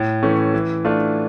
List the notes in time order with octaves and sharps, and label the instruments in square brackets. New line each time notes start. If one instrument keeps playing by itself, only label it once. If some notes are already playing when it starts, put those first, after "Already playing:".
Already playing: [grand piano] A2
E3 A3 C#4
E3
A3 D4 F4